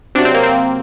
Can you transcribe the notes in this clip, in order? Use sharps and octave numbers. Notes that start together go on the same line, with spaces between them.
C3 F#3 D4
C4
A#3
C4